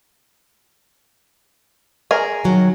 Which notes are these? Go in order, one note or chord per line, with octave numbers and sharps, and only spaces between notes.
G#4 A#4
D#3 F#3